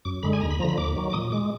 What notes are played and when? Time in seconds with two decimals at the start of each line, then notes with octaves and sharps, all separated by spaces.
0.05 F#2 D6
0.23 D3 G#3 B5
0.33 G#5
0.41 D#2 A#5
0.50 B5
0.59 F3 A#5
0.64 D3 B5
0.78 D#2 D6
0.96 D#3 F#3
1.10 D6
1.13 A#2 D#6
1.32 G#3 D6